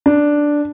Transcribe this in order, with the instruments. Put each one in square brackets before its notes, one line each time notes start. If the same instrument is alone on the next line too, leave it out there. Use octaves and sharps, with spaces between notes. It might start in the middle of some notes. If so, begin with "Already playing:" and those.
[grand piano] D4